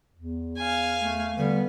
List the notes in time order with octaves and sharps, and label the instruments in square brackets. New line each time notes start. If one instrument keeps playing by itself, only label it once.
[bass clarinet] E2
[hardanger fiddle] F5 G#5
[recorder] A3
[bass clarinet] D3 [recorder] G3 [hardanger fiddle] B3